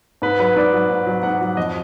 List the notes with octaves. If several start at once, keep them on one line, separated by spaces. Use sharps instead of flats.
G#2 B4
F#3 B4
G#2 D5
F#3
G#2
F#3
G#2 F#5
F#3
F2 D#5